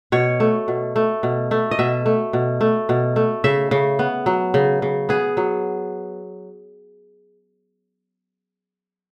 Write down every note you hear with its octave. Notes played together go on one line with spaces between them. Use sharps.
B2 C#5
A3
B2
A3
B2
A3
D#5
B2 E5
A3
B2
A3
B2
A3
C#3 E5
C#3
B3
F#3
C#3
C#3
B3 G#4
F#3